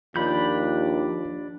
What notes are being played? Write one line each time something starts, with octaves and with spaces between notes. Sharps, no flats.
D#2 F3 D4 F4 G4 B5 G6